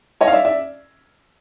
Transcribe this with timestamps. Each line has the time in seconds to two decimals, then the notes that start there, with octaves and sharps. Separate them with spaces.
0.21 C#5 D#5
0.27 F5
0.32 D5 E5
0.45 D5 E5